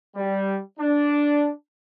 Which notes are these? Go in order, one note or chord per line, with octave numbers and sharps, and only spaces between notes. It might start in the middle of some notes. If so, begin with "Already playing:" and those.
G3
D4